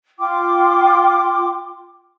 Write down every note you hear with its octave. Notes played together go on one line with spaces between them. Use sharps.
F4 G5 C6 D6